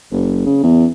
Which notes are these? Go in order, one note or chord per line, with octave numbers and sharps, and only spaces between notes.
F#1
C#3
E2